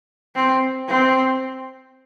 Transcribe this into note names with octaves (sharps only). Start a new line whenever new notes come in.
C4
C4